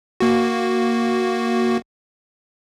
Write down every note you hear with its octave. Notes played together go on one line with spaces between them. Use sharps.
A#3 F#4